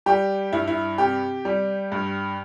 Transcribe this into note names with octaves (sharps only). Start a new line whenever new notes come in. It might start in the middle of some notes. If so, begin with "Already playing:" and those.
G3 G4
G2 E4
E4
C3 G4
G3
G2